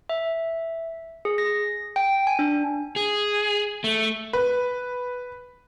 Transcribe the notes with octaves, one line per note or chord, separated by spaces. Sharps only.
E5
G#4
A#6
G5
G#5
D4
G#4
A3
B4